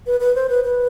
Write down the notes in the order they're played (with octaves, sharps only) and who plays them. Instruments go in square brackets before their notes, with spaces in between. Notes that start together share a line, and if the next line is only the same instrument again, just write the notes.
[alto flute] B4
B4
C5
B4
B4